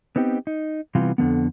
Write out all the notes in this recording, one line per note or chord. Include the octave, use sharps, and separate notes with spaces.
B3 C4 D#4 G4
D#4
C3 E3 G3 B3 F4
F2 D3 F3 B3